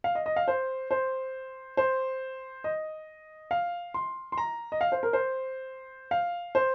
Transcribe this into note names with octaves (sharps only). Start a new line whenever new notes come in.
F5
D#5
D#5
F5
C5
C5
C5
D#5
F5
C6
C6
A#5
D#5
F5
C5
A#4
C5
F5
C5